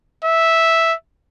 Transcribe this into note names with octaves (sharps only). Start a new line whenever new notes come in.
E5